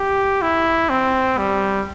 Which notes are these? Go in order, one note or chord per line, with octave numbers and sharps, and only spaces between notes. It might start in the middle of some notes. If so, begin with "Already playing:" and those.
Already playing: G4
E4
C4
G3